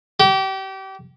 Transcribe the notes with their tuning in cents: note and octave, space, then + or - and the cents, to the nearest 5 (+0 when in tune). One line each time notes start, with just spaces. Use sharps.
G4 -30